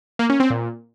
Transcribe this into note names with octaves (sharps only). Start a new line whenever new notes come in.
A#3
C#4
C4
A#2